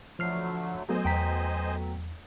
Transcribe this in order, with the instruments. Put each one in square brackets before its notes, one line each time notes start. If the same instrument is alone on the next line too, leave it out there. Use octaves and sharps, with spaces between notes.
[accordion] D3 F#3 A3 [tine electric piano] F3 F6 C7
[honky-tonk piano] F#3 A3 B3 [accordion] C5 D#5 G#5
[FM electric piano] E2 [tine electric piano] G5 A#5 B6